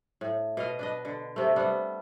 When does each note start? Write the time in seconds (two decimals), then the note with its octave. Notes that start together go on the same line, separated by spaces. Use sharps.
0.21 A2
0.57 B2 D#5 F5
0.79 D4 B4 D#5
1.05 D3
1.36 C3 A3
1.56 G3 B3 D4